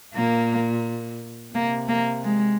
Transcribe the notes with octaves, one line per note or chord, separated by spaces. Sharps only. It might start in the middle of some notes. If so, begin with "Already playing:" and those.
A#2 A#3
C3 A#3
A#3
G#3